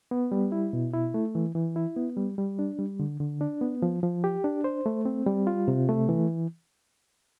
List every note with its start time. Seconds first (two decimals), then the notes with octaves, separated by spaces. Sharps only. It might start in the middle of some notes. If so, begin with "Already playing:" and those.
0.11 B3
0.32 G3
0.52 E4
0.73 B2
0.94 E4
1.14 A3
1.35 E3
1.55 E3
1.76 E4
1.96 B3
2.17 G3
2.38 G3
2.59 D4
2.79 G3
3.00 D3
3.20 D3
3.41 D4
3.61 B3
3.82 F3
4.03 F3
4.24 G4
4.44 D4
4.64 C5
4.86 A3
5.05 C4
5.26 G3
5.47 F4
5.68 C3
5.89 A3
6.09 E3